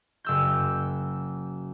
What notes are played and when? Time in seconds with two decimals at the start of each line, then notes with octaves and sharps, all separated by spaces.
0.25 F#1 E6 G6